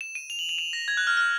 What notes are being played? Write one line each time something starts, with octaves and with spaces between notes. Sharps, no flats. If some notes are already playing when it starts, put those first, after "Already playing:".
E7
D#7
F7
F#7
F7
E7
A#6
G#6
F#6
F6
F6